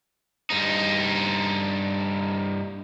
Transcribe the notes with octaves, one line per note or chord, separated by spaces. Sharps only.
G2 D#4